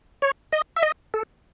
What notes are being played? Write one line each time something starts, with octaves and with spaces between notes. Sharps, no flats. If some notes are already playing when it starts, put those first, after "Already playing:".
C#5
D#5
E5
D#5
A4